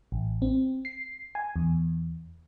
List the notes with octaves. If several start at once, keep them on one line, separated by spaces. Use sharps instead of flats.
A1
C4
C7
G#5
E2